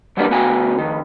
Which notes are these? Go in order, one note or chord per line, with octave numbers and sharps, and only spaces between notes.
E3 F#3 G3 A#3 B3 D4
D2 B3 F#4 G5 G#5
F2 D#3